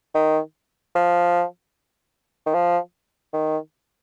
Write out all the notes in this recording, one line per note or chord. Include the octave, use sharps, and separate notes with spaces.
D#3
F3
D#3
F3
D#3